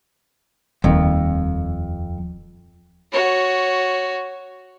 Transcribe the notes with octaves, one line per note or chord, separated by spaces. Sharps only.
D#1 F2 D#3
F#4 C#5